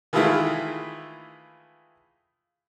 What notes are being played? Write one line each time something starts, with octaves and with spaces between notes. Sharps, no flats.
D#3 E3 G#3 A3 E4 F4